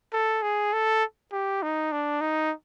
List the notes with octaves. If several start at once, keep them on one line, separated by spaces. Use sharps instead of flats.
A4
G#4
A4
G4
D#4
D4
D#4